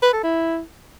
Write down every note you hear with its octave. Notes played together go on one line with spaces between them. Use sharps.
B4
A4
E4